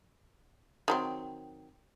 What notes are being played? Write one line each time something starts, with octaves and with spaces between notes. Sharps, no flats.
D#3 F#3 C4